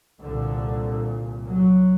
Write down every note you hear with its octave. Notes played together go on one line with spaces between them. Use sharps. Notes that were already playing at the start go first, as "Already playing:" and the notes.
C2 A#2 D3
F#3